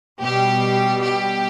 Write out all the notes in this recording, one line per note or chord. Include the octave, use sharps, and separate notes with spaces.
B2 G3 G4
G4